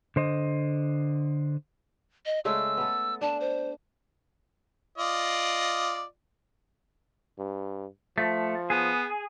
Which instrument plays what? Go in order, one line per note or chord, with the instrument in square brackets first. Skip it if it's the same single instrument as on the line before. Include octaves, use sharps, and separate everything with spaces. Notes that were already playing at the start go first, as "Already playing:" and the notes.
[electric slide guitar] D3 C5 D#5
[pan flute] D#5
[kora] C#3 G#3 A3 [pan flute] E6
[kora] B3 A4
[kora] D4 [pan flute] A5
[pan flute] C5
[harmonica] F4 D5 D#5
[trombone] G2
[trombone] F3 [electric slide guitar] A3
[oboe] B3 [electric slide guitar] G#4